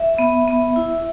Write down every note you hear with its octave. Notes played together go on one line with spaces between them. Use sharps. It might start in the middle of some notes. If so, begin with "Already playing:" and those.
Already playing: E5
B3
B3
E4